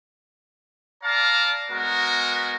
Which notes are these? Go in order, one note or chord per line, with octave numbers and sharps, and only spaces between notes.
D5 F5 A5 A#5
G#3 B3 F#4 A#4